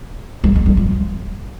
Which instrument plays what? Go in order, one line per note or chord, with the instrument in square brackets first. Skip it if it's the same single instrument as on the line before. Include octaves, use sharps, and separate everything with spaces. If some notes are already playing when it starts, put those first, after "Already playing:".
[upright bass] G#3
G#3
G3
F3